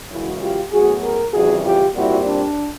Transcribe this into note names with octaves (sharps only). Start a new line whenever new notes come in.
F#2 C#3 E3 G#3 C#4 E4 F#4
F4 G4
A2 F#3 B3 F#4 G#4
G#4 A#4
F2 C#3 E3 G3 F#4 G#4
F4 G4
A#2 G3 C4 E4 F#4
D4